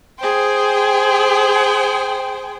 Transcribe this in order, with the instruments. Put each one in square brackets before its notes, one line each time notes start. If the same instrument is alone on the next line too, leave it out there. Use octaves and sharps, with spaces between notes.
[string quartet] G#4 C5 G5